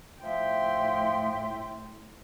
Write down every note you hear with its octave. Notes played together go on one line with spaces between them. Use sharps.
A2 F3 E5 G5 C6